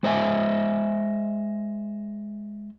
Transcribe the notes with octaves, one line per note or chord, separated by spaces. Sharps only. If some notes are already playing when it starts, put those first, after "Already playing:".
G#3 C5 D#5 E5 G#5